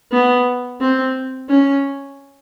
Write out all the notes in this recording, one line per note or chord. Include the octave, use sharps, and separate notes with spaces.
B3
C4
C#4